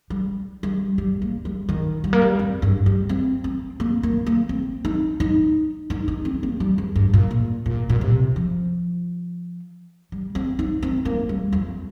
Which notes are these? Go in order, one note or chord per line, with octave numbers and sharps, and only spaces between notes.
G3
G3
G3
A#3
G3
D#3
G3
A#3
G3
F2
G2
G3
C4
C4
A#3
A#3
A#3
C4
D#4
D#4
D#4
D#4
C4
A#3
G3
F2
G2
A#2
A#2
A#2
A#2
C3
F3
G3
C4
D#4
C4
A#3
G3
F2